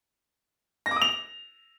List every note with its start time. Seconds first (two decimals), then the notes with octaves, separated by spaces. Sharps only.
0.86 A#6
0.91 D6
0.96 D#6
1.01 F7